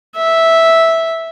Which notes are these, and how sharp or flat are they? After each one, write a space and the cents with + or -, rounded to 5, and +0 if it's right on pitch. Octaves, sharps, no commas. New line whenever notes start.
E5 -5